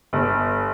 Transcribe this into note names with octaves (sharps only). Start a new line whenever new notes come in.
G1